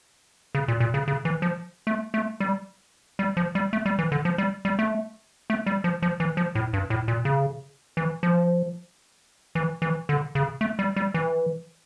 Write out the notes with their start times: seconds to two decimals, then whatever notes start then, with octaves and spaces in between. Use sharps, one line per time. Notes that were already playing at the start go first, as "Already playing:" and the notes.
0.55 C#3
0.68 A#2
0.80 A#2
0.94 C#3
1.08 C#3
1.25 E3
1.42 F3
1.87 A3
2.14 A3
2.40 G3
3.19 G3
3.37 F3
3.55 G3
3.73 A3
3.86 G3
3.99 E3
4.12 D3
4.25 F3
4.38 G3
4.65 G3
4.79 A3
5.50 A3
5.66 G3
5.84 F3
6.02 F3
6.20 E3
6.37 F3
6.55 A2
6.73 G2
6.90 A2
7.08 A#2
7.25 C#3
7.97 E3
8.23 F3
9.55 E3
9.82 E3
10.09 D3
10.35 C#3
10.61 A3
10.79 G3
10.96 G3
11.14 E3